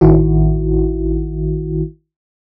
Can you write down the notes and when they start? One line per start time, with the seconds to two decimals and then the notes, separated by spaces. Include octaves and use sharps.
0.01 A1 D#3 E4 F#4